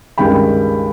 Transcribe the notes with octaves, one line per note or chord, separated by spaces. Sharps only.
C#2 G2 D#3 G#4 G5 B5